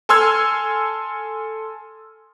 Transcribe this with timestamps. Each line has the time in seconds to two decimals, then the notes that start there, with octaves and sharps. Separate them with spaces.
0.09 A4 G#5 C6 E6 F6 G#6